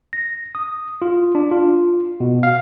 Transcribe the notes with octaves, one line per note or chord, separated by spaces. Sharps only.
A#6
D#6
F4
D4
F4
B2
F5